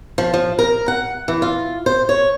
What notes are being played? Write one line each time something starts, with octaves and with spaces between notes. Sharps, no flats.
F3
F3
A#4
F#5
E3
F4
C5
C#5